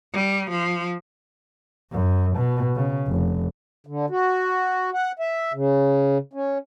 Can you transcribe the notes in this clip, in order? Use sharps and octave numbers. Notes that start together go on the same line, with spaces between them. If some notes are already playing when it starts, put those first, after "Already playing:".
G3
F3
F#2
B2
C#3
F1
D3
F#4
F#5
E5
C#3
C#4